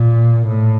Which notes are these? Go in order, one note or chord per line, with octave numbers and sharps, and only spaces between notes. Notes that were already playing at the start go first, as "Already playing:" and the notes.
Already playing: A#2
A2